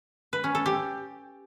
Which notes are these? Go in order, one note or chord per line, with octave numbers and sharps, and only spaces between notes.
B4
C#4
A4
G4